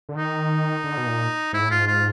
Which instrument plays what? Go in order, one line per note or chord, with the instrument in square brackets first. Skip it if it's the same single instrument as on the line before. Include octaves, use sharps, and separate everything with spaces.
[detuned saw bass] D3
[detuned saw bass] D#3 [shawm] D#4
[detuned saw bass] D3
B2
A#2
[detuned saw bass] G#2 [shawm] E4
[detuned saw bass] A2
[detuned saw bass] G#2 [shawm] F4
[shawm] F4